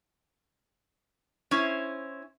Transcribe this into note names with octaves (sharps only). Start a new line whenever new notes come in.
C#4 E4 C5